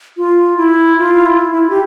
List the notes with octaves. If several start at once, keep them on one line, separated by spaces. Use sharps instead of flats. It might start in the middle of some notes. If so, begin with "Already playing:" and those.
F4
E4
F4
E4
E4
G4